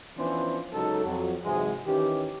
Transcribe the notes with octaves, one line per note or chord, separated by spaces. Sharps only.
E3 F3 B3 C#4 D4 C5
C#2 F#3 D#4 A4
F2 F#3
G#2 C3 E3 F#3 G#3
D#3 E3 C#4 G4